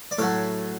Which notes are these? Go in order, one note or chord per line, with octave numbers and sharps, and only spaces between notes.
D5
A2 F#3 A3 A4 C#5